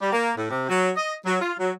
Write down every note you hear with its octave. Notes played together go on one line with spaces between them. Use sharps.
G3
A#3
A2
C3
F#3
D#5
F#3
F4
F#3